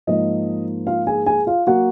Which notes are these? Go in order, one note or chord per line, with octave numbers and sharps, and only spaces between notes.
G#2 F3 A#3 D#5
F4 F5
G#4 G#5
G#4 G#5
F4 F5
F#3 A#3 F#4 F#5